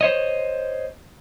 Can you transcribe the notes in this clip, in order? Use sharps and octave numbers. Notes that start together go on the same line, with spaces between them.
C5 C#5 D#5